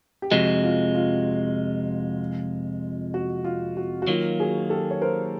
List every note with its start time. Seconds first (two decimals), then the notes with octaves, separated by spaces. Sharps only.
0.22 G4
0.31 F2 C3 F3 G#3 F#4
0.63 F4
0.95 F4
3.14 F#4
3.44 F4
3.77 F#4
4.02 F#4
4.07 D#3 F#3 A#3 F4
4.40 F#4 G#4
4.70 G4 A4
4.91 C#5
5.02 A#4 C5